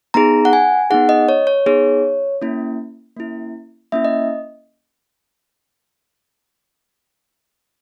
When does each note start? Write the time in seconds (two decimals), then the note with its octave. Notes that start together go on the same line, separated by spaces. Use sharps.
0.14 B3 D#4 G#4 A#5
0.45 F#5
0.53 G#5
0.90 B3 D#4 G#4 F#5
1.09 D#5
1.29 C#5
1.47 C#5
1.66 B3 D#4 G#4 C#5
2.42 A#3 C#4 E4
3.17 A#3 C#4 E4
3.92 A#3 C#4 E4 E5
4.05 D#5